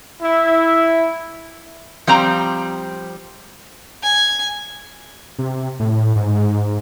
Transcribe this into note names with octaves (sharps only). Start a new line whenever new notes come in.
E4
F3 G3 C4 A#5
G#5
C3
A2
G#2
G#2